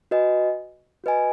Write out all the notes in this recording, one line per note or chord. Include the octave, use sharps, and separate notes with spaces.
F#4 B4 D#5 G#5
F#4 B4 D#5 G#5